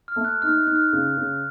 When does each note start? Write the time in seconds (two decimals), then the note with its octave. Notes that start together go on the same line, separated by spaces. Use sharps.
0.08 F6
0.16 A3
0.25 F#6
0.42 D#4 F6
0.66 D#4 F#6
0.75 F6
0.93 C#3
1.17 C#3